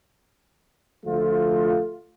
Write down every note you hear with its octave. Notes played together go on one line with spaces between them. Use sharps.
D2 F3 A3 F4